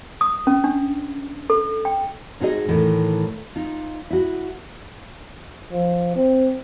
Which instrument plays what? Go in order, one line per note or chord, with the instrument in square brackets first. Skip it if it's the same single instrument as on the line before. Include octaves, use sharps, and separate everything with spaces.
[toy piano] D#6
C#4
D4
A4
G5
[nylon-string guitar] G#2 D#4 F#4 G#4 A4 D#5
A2 D#3 E3
D#4 F4
E4 F#4
[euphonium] F3
C4